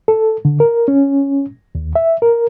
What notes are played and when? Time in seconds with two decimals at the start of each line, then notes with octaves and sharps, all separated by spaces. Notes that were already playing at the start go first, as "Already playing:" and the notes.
0.08 A4
0.45 D3
0.60 A#4
0.88 C#4
1.75 D#2
1.95 E5
2.22 A#4